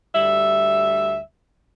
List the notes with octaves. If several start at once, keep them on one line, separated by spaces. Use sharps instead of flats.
D2 G3 E5